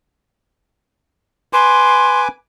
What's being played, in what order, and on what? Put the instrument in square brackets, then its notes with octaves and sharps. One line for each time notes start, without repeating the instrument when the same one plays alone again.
[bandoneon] B4 G#5 D6 [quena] C6